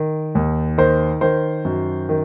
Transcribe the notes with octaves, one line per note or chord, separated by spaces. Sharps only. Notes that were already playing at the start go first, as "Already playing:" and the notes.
Already playing: D#3
D#2
D#3 C5
D#3 C5
F#2
D#3